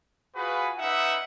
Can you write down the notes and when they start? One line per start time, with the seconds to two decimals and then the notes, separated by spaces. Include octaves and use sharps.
0.35 F4 F#4 G#4 B4
0.79 C#4 D#4 B4 E5 F#5